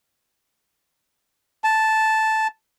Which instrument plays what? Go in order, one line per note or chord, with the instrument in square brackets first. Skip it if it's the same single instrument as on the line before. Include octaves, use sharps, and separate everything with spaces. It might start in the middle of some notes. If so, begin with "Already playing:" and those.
[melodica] A5